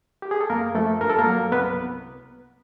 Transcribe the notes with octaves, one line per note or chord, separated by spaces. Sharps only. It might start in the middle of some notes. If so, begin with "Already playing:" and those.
G4
G#4
A4
F#2 A#3 A#4
F3 A3 A4
G2 A#4
A4
A#3 A#4
F#3
C2 B3 B4